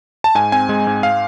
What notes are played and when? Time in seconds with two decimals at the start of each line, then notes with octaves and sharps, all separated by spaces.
0.24 A5
0.35 G#2 G#5
0.52 C4 G#5
0.69 G#3
0.87 G#2
1.03 F5